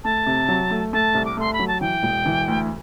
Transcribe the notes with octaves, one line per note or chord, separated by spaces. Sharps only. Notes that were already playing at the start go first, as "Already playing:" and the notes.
A3 A5
C3
F#3
A3
A3 A5
C2
D6
A3 C6
B5
F#3
A5
E3 G5
E1
E3
D2